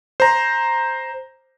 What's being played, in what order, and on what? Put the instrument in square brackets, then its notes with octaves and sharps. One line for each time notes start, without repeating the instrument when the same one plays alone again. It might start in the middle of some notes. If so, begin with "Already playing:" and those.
[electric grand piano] C5 A#5